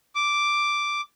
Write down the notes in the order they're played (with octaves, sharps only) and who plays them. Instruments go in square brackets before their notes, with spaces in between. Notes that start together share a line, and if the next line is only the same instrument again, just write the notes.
[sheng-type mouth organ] D6